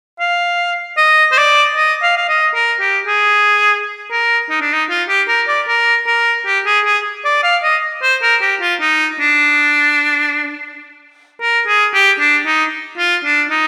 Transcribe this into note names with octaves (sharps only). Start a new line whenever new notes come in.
F5
D#5
C5
D5
D#5
F5
F5
D#5
A#4
G4
G#4
A#4
D#4
D4
D#4
F4
G4
A#4
D5
A#4
A#4
G4
G#4
G#4
D5
F5
D#5
C5
A#4
G4
F4
D#4
D4
A#4
G#4
G4
D4
D#4
F4
D4
D#4